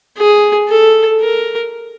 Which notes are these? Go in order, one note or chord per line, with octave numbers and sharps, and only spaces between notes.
G#4
A4
A#4